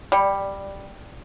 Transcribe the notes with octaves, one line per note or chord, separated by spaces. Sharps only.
G3 D5 G5